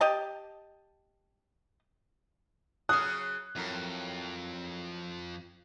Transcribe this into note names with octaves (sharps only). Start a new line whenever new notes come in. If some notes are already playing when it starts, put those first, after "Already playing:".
G4 D#5 A5
C#3 F#3 C#4 D#6 F6 F#6
F2 A2 F#3 A#4